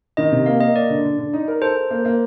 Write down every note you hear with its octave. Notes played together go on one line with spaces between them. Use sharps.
D#3 D#5
C3
A#3 F5
A#3 D#5
A#3 D5
D3
D3
D3
D#4
A#4
A4 C5
A4
A#3
A#3